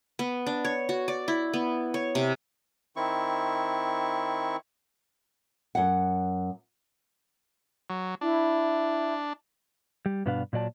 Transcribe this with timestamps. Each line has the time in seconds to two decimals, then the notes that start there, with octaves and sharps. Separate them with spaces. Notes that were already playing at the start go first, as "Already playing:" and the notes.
0.19 B3
0.46 D4
0.65 C#5
0.89 F#4
1.08 D5
1.28 E4
1.53 B3
1.94 C#5
2.15 C3
2.96 D#3 C4 E4 C#6
5.75 F#2 F#5
7.90 F#3
8.21 D4 E4
10.06 G3
10.26 G2 B2 B3 D4 B4 F5
10.53 A#2 F#3 D5 A5